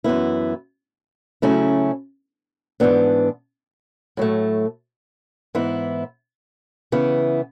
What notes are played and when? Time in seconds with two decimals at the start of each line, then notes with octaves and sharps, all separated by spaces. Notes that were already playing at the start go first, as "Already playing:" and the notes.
0.04 F#2 E3 B3 E4
1.42 C#3 F#3 A3 C#4 E4
2.80 G#2 E3 B3 D4
4.17 A2 F#3 A3
5.55 G#2 E3 B3 E4
6.92 C#3 E3 B3 E4